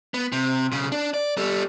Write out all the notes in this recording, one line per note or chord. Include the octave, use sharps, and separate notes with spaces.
B3
C3
B1 C#3
D4
D5
G3 A4